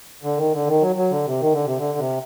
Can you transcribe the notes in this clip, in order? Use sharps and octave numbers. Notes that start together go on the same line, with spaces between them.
D3
D#3
D3
D#3
F#3
F#3
D3
C3
D#3
D3
C3
D3
C3